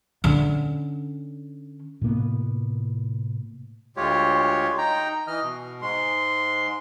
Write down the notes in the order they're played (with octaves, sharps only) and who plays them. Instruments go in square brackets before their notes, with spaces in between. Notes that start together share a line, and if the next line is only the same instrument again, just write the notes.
[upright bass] D3 C#4
[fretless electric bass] A2 C3 A#3 B3
[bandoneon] D2 G#3 F4 G4 C#5
D#4 G5 A#5
E3 D#5 F6
B2
G#2 G#3 C6